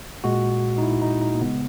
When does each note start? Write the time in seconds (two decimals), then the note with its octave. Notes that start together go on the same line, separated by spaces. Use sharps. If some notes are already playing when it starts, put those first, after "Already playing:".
0.24 A#2 G#3 F#4
0.78 D#4
0.83 E4
1.02 D#4
1.21 D#4
1.35 A#3
1.41 C#3 G#3 B3